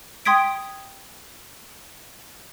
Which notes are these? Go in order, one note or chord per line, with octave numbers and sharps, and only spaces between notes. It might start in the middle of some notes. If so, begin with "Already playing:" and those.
G5 C6 D#6 G#6 B6 D7